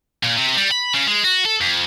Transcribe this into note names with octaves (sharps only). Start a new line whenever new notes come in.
A#2
C3
G3
B5
C#3
G#3
F#4
A4
F2